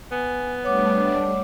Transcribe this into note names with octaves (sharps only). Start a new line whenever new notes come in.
B3 G#5
G3 A3 D4 C#5 F#5 D6